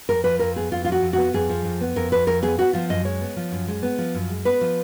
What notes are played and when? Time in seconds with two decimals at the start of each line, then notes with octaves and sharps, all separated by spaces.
0.09 F2 A#4
0.24 F3 B4
0.39 F2 A#4
0.56 B3 G#4
0.72 F2 F4
0.85 F4
0.87 F3 F#4
1.02 F2
1.13 B3 F#4
1.33 F2 G#4
1.49 F3
1.65 F2
1.81 B3
1.96 F2 A#4
2.12 F3 B4
2.27 F2 A#4
2.42 B3 G#4
2.58 B3 F#4
2.73 F3 F4
2.89 F#2 D#5
3.05 G#3 C#5
3.21 B3
3.37 F3
3.51 F#2
3.68 G#3
3.82 B3
3.98 F3
4.14 F#2
4.29 G#3
4.45 B3 B4
4.61 F3